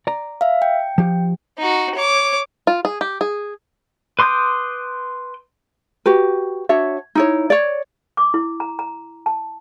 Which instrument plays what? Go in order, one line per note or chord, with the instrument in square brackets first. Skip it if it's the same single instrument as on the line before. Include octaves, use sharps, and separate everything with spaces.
[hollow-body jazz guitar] D5 A#5
[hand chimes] E5 F5
G5
[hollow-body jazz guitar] F3 G4
[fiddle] D#4 F#4
C#5 D6
[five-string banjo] F4
G#4
G4
G#4
[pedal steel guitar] B4 C6 D6 D#6 G6
[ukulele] F#4 G4 B4
D4 F#4 C#5 E5
D#4 E4 C#5
C#5 D5
[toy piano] D6
E4
A#5
A#5
A5